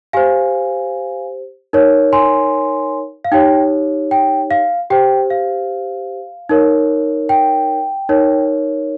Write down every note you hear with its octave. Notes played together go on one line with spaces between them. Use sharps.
G4 C5 F5 G#5
D#4 A#4 C#5
G#5 C6
F5
D#4 G4 C#5 G5
G5
F5
G4 C5 G5
F5
D#4 A#4 C#5
G5
D#4 A#4 C#5